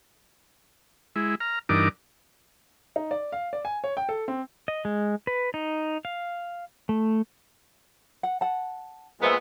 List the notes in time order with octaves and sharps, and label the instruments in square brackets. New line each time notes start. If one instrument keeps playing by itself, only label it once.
[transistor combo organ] G#3 E4
A#5 F6
G2 E3 D4 D#4 A#4 D6
[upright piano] D#4
D5
F5
D5
G#5
C#5
G5
A4
C4
[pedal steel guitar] D#5
G#3
B4
D#4
F5
A3
[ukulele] F#5
F#5 A5
[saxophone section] A#2 G#3 B3 [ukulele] A#4 C5 E5